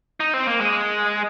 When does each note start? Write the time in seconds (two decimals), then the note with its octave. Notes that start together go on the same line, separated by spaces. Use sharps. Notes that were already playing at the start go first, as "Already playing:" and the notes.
0.20 D#4
0.34 C4
0.47 A#3
0.61 G#3